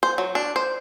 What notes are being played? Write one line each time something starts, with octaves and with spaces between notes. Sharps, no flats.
C5
F#3
D4
C5